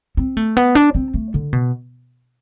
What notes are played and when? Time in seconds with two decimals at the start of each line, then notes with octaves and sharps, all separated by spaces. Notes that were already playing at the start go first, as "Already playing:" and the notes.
0.17 C4
0.37 A3
0.57 B3
0.75 D4
0.95 C4
1.14 A3
1.34 D3
1.53 B2